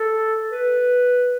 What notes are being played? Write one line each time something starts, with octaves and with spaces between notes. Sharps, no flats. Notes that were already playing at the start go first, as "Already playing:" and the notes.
Already playing: A4
B4